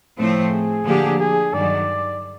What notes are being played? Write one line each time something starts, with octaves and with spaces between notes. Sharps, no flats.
A2 F3 A3 C4
G#4
D3 F3 A#3 D4 G4
G#4
G2 D#3 F#3 D5